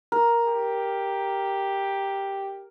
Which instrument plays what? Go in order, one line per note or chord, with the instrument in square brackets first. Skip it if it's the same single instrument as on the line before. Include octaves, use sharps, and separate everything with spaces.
[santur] A#4
[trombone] G4